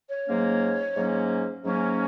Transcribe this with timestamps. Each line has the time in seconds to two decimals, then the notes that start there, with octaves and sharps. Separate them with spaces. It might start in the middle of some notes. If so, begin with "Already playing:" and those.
0.11 C#5
0.27 G#2 F#3 A#3 C#4
0.96 G#2 F#3 A#3 C#4
1.64 G#2 F#3 A#3 C#4